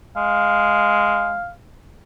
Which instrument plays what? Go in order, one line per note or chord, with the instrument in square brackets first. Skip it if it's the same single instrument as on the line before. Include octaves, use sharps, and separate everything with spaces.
[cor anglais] G#3 [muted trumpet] F5